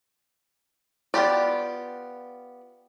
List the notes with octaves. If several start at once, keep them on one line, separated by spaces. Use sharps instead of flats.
B3 F4 G4 D5